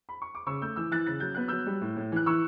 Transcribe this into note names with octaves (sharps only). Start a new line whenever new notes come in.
B5
C#6
D6
C#3 C#6 E6
A3 E6 G6
E3 E6 G6
E3 F#6 A6
C#3 A6
F#3 G6
B3 F#6
F#3 E6 G6
G3
A2
A2
E3 F#6
E3 C#6 E6